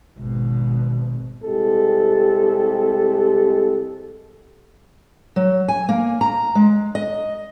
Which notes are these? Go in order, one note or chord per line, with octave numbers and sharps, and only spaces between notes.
G#1 B2
C2 G#3 G4 A4
F#3
G#5
A#3
A#5
G#3
D#5